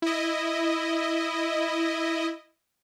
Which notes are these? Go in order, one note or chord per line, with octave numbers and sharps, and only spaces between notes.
E4 D#5